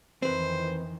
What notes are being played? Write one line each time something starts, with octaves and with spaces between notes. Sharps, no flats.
F2 D#3 E3 C4 B4 C5